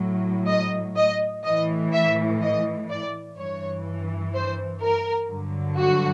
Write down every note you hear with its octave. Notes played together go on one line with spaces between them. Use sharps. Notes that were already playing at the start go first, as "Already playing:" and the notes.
Already playing: A2 F#3
D#5
D#5
A2 E3 D#5
E5
D#5
D5
G2 E3 C#5
C5
A#4
G2 D3 F#3
F#4